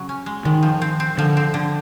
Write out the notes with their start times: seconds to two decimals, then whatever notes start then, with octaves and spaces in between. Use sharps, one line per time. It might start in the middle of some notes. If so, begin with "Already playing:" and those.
Already playing: C#3 F#3
0.09 C#4
0.26 G#3
0.45 D#3 G#3
0.63 F3
0.82 C4
1.00 C4
1.18 D3 F3
1.37 C4
1.54 D3